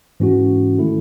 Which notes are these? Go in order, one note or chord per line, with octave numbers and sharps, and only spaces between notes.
G#2 E3 G#3 C#4 F#4
D#3 A3 E4 A4